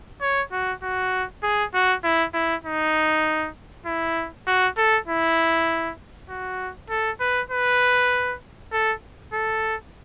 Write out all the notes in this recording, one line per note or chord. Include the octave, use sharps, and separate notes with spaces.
C#5
F#4
F#4
G#4
F#4
E4
E4
D#4
E4
F#4
A4
E4
F#4
A4
B4
B4
A4
A4